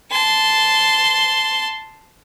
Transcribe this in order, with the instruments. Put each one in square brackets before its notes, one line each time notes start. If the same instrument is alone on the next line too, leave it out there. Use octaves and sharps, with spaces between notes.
[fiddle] A5 C6